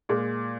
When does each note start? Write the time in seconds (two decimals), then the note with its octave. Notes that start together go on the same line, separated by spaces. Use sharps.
0.09 A#2 G#3